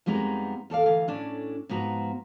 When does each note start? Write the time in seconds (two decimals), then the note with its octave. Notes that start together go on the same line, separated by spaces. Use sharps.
0.06 F2 G3 G#3 B3 D#4 A#5
0.70 E2 A4 D5 F5
0.86 D2 E3 F5
1.08 A2 C#4 D4 D5
1.69 G#2 F3 B3 F#4 A#5